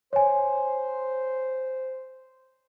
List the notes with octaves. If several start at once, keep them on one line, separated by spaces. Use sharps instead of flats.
C5 C#5 G#5